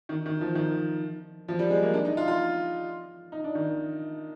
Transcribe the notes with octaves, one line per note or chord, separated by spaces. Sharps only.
D#3
D#3
F3
D#3
F3
G3
G#3
A#3
D4
D#4
F4
F4
D#4
D4
D#3